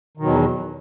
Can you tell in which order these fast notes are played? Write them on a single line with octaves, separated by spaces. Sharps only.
D#3 B2 F#3 E2